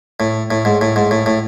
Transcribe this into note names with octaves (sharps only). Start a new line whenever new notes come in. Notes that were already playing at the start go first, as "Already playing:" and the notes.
A2
A2
G#2
A2
G#2
A2
A2